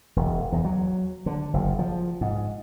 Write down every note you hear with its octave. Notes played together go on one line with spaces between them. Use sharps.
E1
E2
F#3
D3
F#1
F3
G#2